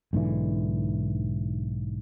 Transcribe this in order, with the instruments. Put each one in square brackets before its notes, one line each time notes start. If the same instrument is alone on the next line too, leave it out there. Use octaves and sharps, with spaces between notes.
[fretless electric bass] B1 G#2 D3 E3